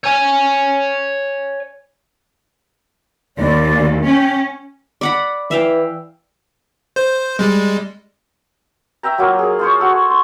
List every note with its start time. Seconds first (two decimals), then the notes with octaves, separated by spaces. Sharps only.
0.04 C#5 G#5
3.37 D#2 D5
4.04 C#4 G5
5.01 D5 F#5 B5
5.51 E3 E5 F5 G5
6.96 C5
7.39 G3 G#3
9.03 E5 G5 A#5
9.18 F#3 A#3 F4
9.39 G#4 A#4
9.59 F4 C5 C#5
9.80 F#4 A4
10.10 C6